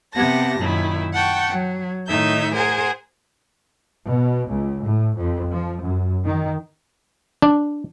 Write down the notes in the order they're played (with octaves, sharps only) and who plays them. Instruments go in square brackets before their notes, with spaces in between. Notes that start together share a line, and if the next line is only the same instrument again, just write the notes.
[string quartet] C3 B3 G4 F#5 A5 A#6
F#2 A#2 D#3 E4
F#5 G5 A5 C#6
F#3
A2 D#3 D#4 E5 G6
G#4 A#4 C5 F#5 G#5
[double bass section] B2
C#2
A2
F2
F3
F#2
D#3
[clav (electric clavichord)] D4